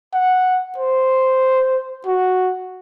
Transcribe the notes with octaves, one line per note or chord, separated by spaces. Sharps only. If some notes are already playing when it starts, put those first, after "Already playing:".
F#5
C5
F#4